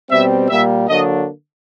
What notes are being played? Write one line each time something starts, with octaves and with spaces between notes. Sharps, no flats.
B2 G3 C4 E5
A#2 G3 A#3 E5
D3 F#3 A#3 D4 D#5